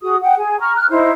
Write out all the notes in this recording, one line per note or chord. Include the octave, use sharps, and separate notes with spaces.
F#4 G#4 D#6
F#5 G5
G#4 G#5
A#5 C#6 F6
F6 F#6
D#4 E4 C5